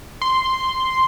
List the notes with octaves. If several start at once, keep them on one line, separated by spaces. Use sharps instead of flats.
C6